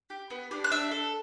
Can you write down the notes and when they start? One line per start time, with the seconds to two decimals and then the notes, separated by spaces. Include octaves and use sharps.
0.10 G4
0.30 B3
0.51 D4 G4
0.64 F#6
0.71 D4 E5 E6
0.91 A4